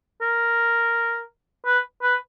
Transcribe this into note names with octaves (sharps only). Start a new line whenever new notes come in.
A#4
B4
B4